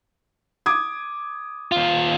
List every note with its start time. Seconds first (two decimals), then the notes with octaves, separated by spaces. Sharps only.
0.66 D6 D#6 G#6
1.72 D#2 F4